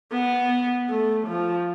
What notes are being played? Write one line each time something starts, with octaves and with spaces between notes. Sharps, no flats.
B3
A3
F3